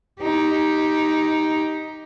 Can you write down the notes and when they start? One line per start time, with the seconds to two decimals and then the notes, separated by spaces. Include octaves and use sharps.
0.21 D#4 G4